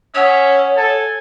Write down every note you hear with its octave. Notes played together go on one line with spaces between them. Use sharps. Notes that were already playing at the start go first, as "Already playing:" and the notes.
C#4 C#5 E5 F#5 D#6
A4 G#5